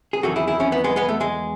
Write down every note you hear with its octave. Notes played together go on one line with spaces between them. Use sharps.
G#4
E2 D#3 F#3 F#4 A4
E4 G#4
E4 G#4
C#4 E4
B3 D#4
G#3 B3
G#3 B3
A3
G#3